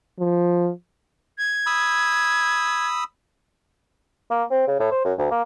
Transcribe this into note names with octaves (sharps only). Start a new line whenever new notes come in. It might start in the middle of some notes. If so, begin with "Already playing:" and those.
F3
G#6
B5 D#6 E6
A#3
C4
C#3
A2
C5
F#2
D2
A#3